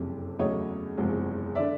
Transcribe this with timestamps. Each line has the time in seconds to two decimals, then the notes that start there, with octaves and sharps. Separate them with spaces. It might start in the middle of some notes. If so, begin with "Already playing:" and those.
Already playing: F#1 F2 C3
0.39 E2 C#3 F#3 A3 C#5 D#5
0.97 F#1 E2 C3 F3 G#3
1.55 D3 D5 E5